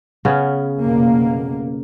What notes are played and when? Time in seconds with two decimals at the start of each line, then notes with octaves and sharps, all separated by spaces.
0.25 C#3 B3 C#4
0.81 F1 B2 A#3